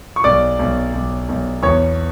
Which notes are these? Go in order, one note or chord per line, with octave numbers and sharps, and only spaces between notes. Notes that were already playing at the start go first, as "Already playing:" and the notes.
C#6
B1 D5 D6
B1
B1
B1
E2 C#5 C#6